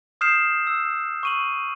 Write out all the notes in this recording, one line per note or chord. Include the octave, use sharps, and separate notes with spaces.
D#6 F6 G6 C7 E7
E6
C#6 D#7 F#7